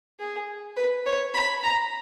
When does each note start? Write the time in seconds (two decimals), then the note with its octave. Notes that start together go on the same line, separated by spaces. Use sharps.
0.20 G#4
0.76 B4
1.06 C#5
1.34 B5
1.63 A#5